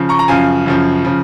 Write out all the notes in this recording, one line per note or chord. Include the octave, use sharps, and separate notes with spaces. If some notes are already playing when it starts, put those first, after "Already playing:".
Already playing: C#3 F3
A#5 C#6
A#5
F#2 C#3 F3 F5 G#5
F#2 C#3 F3
C#3 F3